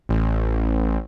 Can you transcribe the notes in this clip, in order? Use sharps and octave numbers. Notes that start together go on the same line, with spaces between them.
A1